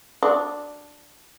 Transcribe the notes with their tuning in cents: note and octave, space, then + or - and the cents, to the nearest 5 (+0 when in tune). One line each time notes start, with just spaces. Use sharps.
D4 +0 F#4 +0 D5 +0